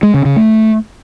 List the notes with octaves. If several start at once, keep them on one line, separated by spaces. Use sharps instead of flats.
G#3
C#3
C#3
A3